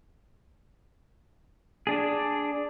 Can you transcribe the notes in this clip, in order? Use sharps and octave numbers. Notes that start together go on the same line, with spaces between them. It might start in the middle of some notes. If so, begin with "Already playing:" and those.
D4 G#4